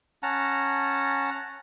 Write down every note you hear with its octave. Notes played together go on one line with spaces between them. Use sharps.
C#4 F#5 A5 A#5